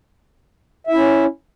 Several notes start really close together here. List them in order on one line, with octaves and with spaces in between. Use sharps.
E5 E4 C#4